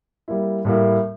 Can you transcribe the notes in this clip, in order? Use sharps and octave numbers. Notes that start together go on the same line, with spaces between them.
G3 A#3 E4
A2 G3 A#3 E4